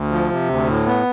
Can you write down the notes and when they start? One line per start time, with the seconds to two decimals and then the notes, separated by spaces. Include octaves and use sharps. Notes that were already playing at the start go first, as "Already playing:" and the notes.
Already playing: D2
0.11 F3
0.31 C3
0.49 D2
0.68 A2
0.86 B3